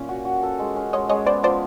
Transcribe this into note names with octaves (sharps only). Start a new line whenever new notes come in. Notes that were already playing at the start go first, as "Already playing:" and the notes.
Already playing: A#2 C#4
F#4
F#4
A4
G#3
C#4
G#3 C#5 D#5
G#3 C#5 D#5
B3 C5 D5
F3 C5 D5